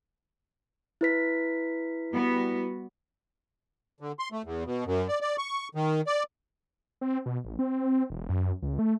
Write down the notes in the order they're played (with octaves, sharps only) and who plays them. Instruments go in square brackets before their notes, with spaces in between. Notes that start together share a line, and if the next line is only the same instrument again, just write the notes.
[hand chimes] E4 B4 B6
[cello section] G3 B3 F#4
[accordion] D3
C6
A3
E2
B2
F#2
D5
D5
C#6
D#3
D5
[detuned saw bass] C4
B2
A1
C4
E1
F#2
C#2
A3